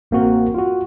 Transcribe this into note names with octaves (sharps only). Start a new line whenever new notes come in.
A1 A#3 C4 F#4 A#4
F4 F#4